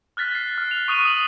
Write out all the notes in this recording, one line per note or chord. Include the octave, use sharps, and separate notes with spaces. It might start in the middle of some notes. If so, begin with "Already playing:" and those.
F6 F#6 A6 B6
C7
F6
F7
C#6 D#6 F#6 D#7 F7
D#6 F#7